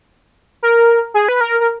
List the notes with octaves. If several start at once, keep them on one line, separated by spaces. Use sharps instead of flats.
A#4
G#4
B4
A#4
A#4